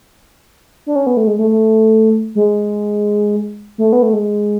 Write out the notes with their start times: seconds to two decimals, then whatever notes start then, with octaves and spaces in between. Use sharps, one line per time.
0.86 D4
0.96 C#4
1.07 B3
1.17 A3
1.27 G#3
1.39 A3
1.51 A3
2.35 G#3
3.78 A3
3.93 B3
4.02 A3
4.13 G#3